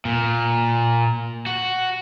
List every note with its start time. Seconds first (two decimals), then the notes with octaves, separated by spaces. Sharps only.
0.05 A#2
1.47 F#4